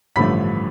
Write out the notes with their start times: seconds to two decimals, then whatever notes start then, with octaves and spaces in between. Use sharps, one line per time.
0.16 A1 G2 D3 F3 A3 B5 B6